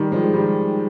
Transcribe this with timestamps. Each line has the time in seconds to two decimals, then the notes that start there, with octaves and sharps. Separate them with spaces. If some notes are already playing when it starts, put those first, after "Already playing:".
Already playing: D#3 G3
0.12 F3 G#3
0.34 D#3 G3